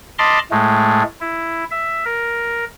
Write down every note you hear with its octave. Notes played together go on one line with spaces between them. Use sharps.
D#5 A5 B5 C6 D6 F6
A2 G#3 A3
E4
E5
A#4